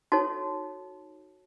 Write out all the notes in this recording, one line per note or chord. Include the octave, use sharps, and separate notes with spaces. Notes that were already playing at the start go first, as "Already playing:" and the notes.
D#4 F#4 A4 C#5 A5